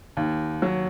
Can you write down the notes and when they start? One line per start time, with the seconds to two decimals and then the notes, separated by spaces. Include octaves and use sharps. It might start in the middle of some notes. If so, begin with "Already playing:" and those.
0.17 D#2
0.62 F#3